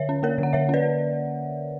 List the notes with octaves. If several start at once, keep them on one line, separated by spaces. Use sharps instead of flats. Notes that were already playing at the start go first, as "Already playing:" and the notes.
Already playing: D3 C#5 E5
C#4
A#3 A#4 C#5
D3
F#5
D3 C#5 E5
C#4 B4 D5